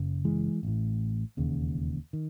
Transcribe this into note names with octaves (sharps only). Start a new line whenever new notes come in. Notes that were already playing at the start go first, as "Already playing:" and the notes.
Already playing: F#1 F#2 C#3
E3 G#3
A1 A2
E1 D#2 C#3
D#3